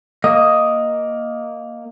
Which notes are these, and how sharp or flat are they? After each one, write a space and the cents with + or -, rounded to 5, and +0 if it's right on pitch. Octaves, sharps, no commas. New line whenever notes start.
A#3 +0 D#5 +0